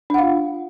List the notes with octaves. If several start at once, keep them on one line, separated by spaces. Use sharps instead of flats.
D4 F4 F5 F#5